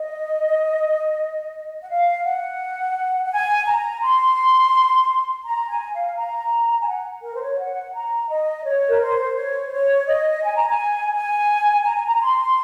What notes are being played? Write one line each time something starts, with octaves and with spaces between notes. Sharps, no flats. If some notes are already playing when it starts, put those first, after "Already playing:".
Already playing: D#5
F#5
F5
F#5
F#5
G#5
A#5
C6
A#5
G#5
F5
A#5
G#5
F#5
A#4
C5
C#5
F#5
A#5
D#5
C#5
A#4
C5
C#5
C5
C#5
D#5
G#5
A#5
G#5
G#5
A#5
G#5
A#5
A#5
C6